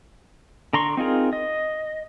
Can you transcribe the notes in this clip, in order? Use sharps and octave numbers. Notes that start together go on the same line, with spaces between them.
D3 A#5 C6 C#6
C4 D#4 F4 G#4 A#4
D#5